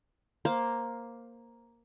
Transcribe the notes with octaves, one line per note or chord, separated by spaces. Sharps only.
A#3 C5 F5